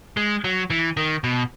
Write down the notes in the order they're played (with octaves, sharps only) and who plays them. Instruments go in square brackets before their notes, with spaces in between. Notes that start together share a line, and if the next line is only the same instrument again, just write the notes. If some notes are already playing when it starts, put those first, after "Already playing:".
[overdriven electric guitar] G#3
F#3
E3
D#3
B2